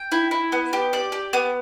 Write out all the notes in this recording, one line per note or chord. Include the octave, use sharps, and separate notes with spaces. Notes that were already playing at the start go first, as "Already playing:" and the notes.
Already playing: G5
E4
E4
B3
G4
D5
G4
B3